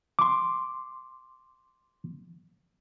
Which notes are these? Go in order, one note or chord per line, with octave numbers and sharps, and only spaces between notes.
C6 D6